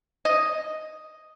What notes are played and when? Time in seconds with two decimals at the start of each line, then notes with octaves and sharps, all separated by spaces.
0.25 D#5